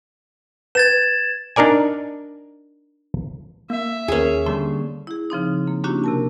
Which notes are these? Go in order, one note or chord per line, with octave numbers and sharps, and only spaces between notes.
B4 G#6 A6 E7
D4 D#4 A#4 D5 G#5
A#3 E5
D#2 C#4 G#4 A#4 G#5
D3 G3 A#3 A5 C6
E4 G#4
C#3 F3 C4 D#4
A#3
A#3 C#4 D4 E4 F#4 G4
C3 A#4 A5